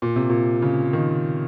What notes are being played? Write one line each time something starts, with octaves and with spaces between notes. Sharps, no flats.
A#2
C3
A#2
C#3
D#3